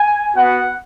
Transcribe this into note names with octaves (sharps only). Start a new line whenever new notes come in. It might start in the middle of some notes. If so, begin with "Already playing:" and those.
Already playing: G#5
B3 F#4 F#5